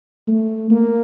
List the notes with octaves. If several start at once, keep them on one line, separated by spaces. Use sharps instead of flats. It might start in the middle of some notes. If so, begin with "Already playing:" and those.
A3
A#3